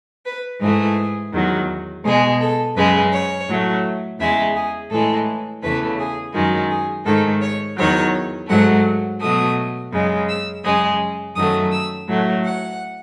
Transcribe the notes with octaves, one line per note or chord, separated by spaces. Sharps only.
B4
G#2 E3 A3 G#4
E2 D#3 F#3
B2 G#3 G#4
A4
F#2 C#3 G#3 B4
C#5
A2 F#3 A3
E2 C#3 G#3 E5
G#4
A2 E3 G#3 A4
E2 C#3 E3 A3 B4
G#4
F#2 D#3 G#3 F#4
G#4
G#2 D#3 A3 A4
C#5
E2 D#3 F#3 C#5
G#2 F#3 A3 F#5
B2 F#3 A3 D#6
F#2 C#3 G#3
E6
F#2 C#3 G#3 D#6
F#2 D#3 F#3 A3 D#6
E6
A2 F#3 A3
F#5